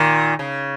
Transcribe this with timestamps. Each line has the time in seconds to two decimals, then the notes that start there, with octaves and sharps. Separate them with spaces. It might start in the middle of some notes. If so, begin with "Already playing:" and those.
Already playing: A#2 D#3
0.39 C#3